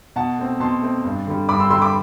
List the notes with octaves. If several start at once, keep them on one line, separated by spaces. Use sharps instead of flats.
B2 F#5 A5
A3 C4
B2 A5 C6
A3 C4
G2
D3 G3
G2 B5 D6
C6 E6
D3 G3 C6 E6
B5 D6